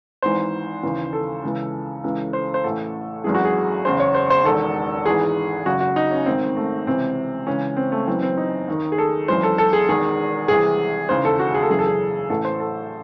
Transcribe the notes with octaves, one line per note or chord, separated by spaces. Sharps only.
G#1 G#2 E3 C5
D#2 C#3 E3
A4
C#2 C#3 E3
C#2 C#3 E3
C5
C5
A1 A2 E3 A4
G#1 F#2 E3 G#4
F#4
G#4
F#1 E2 C#3 C5
C#5
C5
C5
E1 E2 D#3 A4
G#1 G#2 E3 G#4
F#1 F#2 C#3 F#4
F#4
D#4
C#4
A1 G#2 D#3 C4
A3
C#2 C3 E3 C4
C#2 C#3 E3 C#4
C4
A3
F#1 F#2 E3 C4
C4
D#4
D#2 D#3
G#4
A4
G#1 F#2 E3 C5
A4
A4
G#4
E1 E2 D#3 G#4
C2 C3 E3 G#4
E1 D#2 C#3 E3 C5
A4
F#4
G#4
A4
F#1 F#2 C#3 E3 G#4
A4
G#4
A1 A2 E3 A4
C5
A4